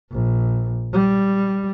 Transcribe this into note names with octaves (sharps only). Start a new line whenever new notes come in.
A#1
G3